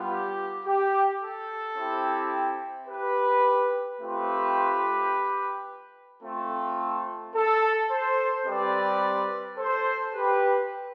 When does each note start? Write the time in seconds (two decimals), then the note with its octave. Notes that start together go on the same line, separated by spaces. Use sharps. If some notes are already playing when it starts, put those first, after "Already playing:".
Already playing: G3 B3 F4
0.10 G4
0.66 G4
1.21 A4
1.77 C4 E4 G4
2.88 G4 B4
4.00 A3 C4 F4 G4 B4
6.23 A3 C4 F4 A4
7.35 A4
7.91 A4 C5
8.46 G3 C4 G4 B4 D5
9.58 A4 C5
10.14 G4 B4